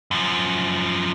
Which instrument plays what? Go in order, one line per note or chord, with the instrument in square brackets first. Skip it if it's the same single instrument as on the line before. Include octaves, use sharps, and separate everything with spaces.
[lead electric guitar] F#2 F3